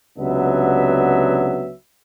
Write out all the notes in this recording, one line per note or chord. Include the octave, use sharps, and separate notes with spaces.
C#2 C3 F#3 B3 D4 E5